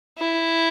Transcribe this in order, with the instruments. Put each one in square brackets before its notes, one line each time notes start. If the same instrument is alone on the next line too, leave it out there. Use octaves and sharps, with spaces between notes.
[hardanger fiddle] E4